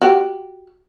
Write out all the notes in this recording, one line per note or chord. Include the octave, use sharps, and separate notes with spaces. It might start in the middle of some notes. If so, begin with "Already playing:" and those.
F#4 G4